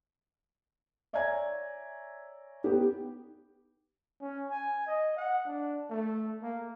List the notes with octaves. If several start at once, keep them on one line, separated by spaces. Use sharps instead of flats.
C#5 D5 E5 G#5 A#5 G#6
B3 D#4 G4
C#4
G#5
D#5
F#5
D4
A3
A#3